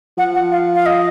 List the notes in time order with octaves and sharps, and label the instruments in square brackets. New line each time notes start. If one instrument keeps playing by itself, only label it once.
[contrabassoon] F3 [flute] F#5
[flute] F#5
F5
F5
D#5